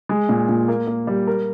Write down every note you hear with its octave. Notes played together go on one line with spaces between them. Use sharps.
G#3
A#2
A#2
A#3
A#3
G3
A#4